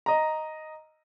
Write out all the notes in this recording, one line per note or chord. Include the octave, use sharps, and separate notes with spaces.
D#5 A#5